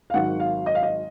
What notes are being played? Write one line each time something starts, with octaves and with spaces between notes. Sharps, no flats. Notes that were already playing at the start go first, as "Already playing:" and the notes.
F5
G#1 G#2 D#3 F#3 F#5
F5
D#5
F5
D#5